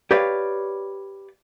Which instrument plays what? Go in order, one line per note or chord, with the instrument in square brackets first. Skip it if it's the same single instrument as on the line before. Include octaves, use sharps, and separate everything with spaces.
[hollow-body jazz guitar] G4 B4 C#5 D5 F5